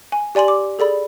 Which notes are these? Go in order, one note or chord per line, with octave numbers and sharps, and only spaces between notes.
G#5
G4 D5 G#5 C6 F#7
D6
G#4 A4 D5 B5